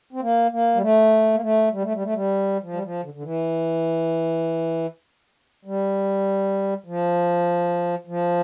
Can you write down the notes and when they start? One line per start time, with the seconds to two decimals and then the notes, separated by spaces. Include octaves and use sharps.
0.13 C4
0.21 A#3
0.51 A#3
0.75 G3
0.81 A3
1.34 A#3
1.42 A3
1.72 G3
1.82 A3
1.93 G3
2.04 A3
2.14 G3
2.63 F3
2.73 G3
2.83 F3
3.03 D3
3.14 D3
3.23 E3
5.65 G3
6.86 F3
8.07 F3